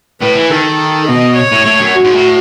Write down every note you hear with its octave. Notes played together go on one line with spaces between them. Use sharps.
A2 B4
E3
D#3 A4
B2 D#5
C#5
A2
A2
F#2
F#4
G#2
A2